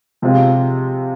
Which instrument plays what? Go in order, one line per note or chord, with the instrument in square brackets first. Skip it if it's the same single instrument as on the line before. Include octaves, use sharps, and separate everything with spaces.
[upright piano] C3 F3 G#3 C4 F4